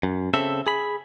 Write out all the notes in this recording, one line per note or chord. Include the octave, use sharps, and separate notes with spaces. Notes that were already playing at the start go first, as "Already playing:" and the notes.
F#2
C#3 C4 A4 E5
G#4 B5